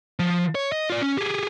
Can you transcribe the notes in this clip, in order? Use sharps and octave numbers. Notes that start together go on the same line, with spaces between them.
F3
C#5
D#5
F4 D5
C#4
G4 G#4